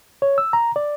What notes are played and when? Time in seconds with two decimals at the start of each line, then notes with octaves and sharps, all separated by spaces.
0.22 C#5
0.38 E6
0.53 A#5
0.76 D5